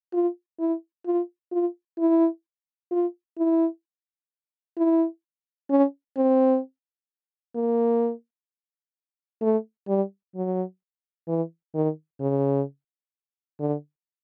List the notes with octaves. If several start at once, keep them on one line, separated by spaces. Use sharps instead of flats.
F4
E4
F4
F4
E4
F4
E4
E4
C#4
C4
A#3
A3
G3
F#3
E3
D#3
C#3
D3